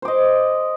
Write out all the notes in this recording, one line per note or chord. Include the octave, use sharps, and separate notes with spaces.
C5 D#5 D6